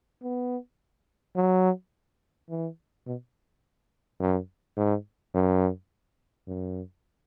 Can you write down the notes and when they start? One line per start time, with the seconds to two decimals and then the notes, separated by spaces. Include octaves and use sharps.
0.23 B3
1.36 F#3
2.50 E3
3.06 B2
4.20 F#2
4.77 G#2
5.34 F#2
6.47 F#2